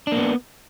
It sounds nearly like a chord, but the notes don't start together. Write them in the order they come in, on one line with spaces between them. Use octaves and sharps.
D4 A#3 B3